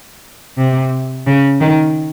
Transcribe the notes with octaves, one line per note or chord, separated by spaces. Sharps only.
C3
C#3
D#3